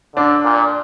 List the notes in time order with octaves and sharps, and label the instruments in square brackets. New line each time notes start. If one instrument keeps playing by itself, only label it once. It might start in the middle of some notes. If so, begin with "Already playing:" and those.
[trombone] D3 [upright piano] D4
[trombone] A#2